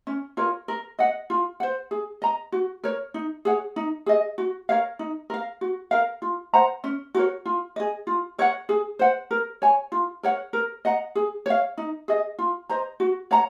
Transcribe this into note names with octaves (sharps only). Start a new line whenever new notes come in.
C#4
F4 A#4 C#5
A#4
D#5 F#5
F4
C5 F#5
G#4
D#5 A#5
F#4
A#4 C#5
D#4
G#4 C#5 F#5
D#4
G#4 D#5
F#4
A#4 C#5 F5
D#4
A#4 F5
F#4
A#4 F5
F4
C5 F#5 A#5
C#4
F#4 A#4 C#5
F4
G#4 D#5
F4
A#4 C#5 F#5
G#4
C5 F#5
A#4
C#5 G#5
F4
A#4 C#5 F#5
A#4
D#5 F#5 A#5
G#4
C#5 F5
D#4
G#4 D#5
F4
C5 D#5 A#5
F#4
C#5 F#5 A#5